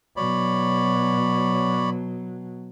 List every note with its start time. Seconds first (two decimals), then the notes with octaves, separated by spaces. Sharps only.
0.17 B2 F#3 C#5 D5 B5